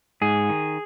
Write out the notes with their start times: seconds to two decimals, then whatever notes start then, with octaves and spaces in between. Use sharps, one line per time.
0.21 G#2 G#4
0.49 D#3